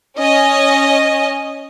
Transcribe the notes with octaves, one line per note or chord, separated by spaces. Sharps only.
C#4 D#5